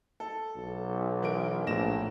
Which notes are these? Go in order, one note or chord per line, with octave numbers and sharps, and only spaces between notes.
A4
B1
E3 A#4 D7
A#1 A2 A#6 E7